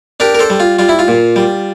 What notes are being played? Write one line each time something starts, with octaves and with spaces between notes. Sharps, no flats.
D4 G4 A#4
A#4
A4 C5
G3
F4
G3 F4
E4
F4
A#2
G3